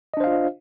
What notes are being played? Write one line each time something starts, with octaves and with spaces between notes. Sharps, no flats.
D4 F4 C5 D#5 F5